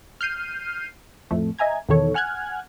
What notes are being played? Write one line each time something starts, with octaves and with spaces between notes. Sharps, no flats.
F6 G6 C7 D#7
F2 A2 A3
D#5 E5 G#5 A#5 G#6
E2 B2 D#3 A4 C#5
F#5 G#5 F6 F#6 G#6